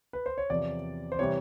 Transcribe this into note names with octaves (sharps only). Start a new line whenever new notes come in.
B4
C5
C#5
E2 C3 F3 D5
C5
C3 E3 G3 C#5